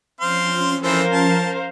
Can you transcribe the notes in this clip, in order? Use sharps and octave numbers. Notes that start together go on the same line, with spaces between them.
F3 C4 C#4 F5 C6
E3 C4 A4 A#4 C5 F5
A5